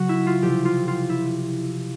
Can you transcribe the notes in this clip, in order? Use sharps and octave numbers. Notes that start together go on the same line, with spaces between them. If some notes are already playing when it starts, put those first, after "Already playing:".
Already playing: C#3 F#3 F#4
E4
F4
C3 F3 G4
F4
F4
E4